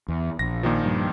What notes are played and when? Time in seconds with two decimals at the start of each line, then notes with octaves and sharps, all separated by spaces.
0.08 E2
0.39 A#1 A#6
0.63 A#2 D#3 F3
0.84 G2